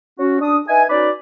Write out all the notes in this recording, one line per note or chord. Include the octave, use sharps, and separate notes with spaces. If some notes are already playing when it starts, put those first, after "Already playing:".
C#4 F#4
D4 D#6
D#4 B4 E5 G#5
C#4 D#4 F#4 B4 D5